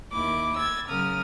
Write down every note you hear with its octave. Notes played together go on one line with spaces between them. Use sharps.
D#2 E4 D6
E6 G#6 A6
C#3 F#3 A#4 D#6 F6